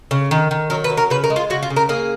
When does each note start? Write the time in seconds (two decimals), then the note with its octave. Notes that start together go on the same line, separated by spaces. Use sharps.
0.11 C#3
0.31 D#3
0.51 D#3
0.70 F#3 A#4
0.84 B4
0.90 F#3
0.97 A#4
1.10 C#3 B4
1.24 A#4
1.30 G#3
1.36 F4
1.50 C#3 F#4
1.63 F4
1.70 C#3
1.76 A#4
1.89 A#3 G#4